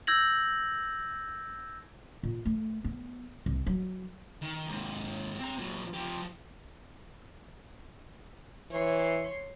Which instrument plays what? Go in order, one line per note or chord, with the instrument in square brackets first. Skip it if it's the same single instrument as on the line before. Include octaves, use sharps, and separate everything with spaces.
[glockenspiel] E6 G6 G#6 A#6 F#7
[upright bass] A#2
A3
B3
C2
F#3
[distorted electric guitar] D#3
D#2 G#2
C4 A#5
A#2 F#3
F3 G4
[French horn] E3 [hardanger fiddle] C#5 C6